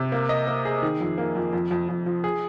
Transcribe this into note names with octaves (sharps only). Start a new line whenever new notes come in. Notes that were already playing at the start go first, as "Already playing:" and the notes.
Already playing: C3
A#3
D#5
A#3
G#4
D#3
F2
A#3
F2
F2
F2
F2
F3
G#4